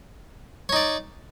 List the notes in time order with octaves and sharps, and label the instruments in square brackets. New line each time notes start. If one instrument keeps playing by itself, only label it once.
[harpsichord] C#5
D#4
D5